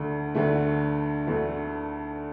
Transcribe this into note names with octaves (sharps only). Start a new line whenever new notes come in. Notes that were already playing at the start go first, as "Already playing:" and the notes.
Already playing: D2 D3 A3
D2 D3 A3
D2 D3 A3